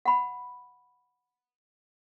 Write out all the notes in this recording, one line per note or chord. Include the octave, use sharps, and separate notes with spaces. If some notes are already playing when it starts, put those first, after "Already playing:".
F#5 B5